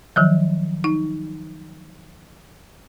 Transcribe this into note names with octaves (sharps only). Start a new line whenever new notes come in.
D#3 F3 F#3
D#4